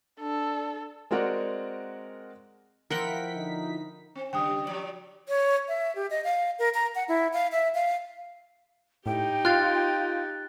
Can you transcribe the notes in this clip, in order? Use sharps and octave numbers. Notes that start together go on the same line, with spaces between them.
D4 A4
G#3 C4 F#4 A#4 D5 F#5
F3 E4 A#4 F#5 G5 B6
D3 D#4
C4
C#3 G3 G5 D#6
F3 F#3 D5
C#5
E5
G4
D#5
F5
A#4
A#5
F#5
E4
F5
E5
F5
A2 D#4 G4 G5
F4 F#6 A6